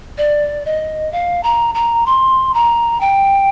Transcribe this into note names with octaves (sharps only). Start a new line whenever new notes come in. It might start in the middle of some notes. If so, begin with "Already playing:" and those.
D5
D#5
F5
A#5
A#5
C6
A#5
G5